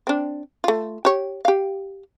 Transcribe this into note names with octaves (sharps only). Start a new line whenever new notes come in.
C4 D4
A3 F4
G4 C#5
G4 F5